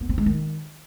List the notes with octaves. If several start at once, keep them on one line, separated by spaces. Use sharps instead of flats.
B3
C4
G#3
D#3